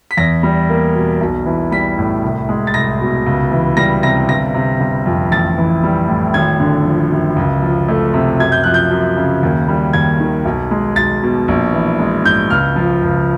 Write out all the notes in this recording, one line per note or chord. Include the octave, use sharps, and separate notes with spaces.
B6
E2 A#6
G3
A#3
B2
B1
E3
G3 B6
A2
C2
G#3
A6
C2 A#6
B2
C#2
E3
G3 A#6
C3 A#6
G1 A#6
C3
G1
F2
A1 A6
E3
G3
A2
G#1 G#6
D3
F3
F#2
C#2
F3
A3
C3
F#2 G#6
G6
F3 F#6
G6
F#2
C#3
D#2
G3
D#2 G#6
D#3
B1
G#3
B1 A6
B2
A#1
E3
G#3
G#2 G6
C#2 F6
F3
C#2